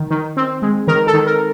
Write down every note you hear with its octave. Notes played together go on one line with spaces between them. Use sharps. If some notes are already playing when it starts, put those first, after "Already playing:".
Already playing: D#3
D#3
C4
G#3
D#3 A#4
A4
D#3
A#4